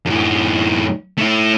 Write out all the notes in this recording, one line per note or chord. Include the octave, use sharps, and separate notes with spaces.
F#2 A2
A3 E4